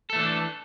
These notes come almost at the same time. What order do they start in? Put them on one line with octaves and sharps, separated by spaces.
A4 A3 E3 D4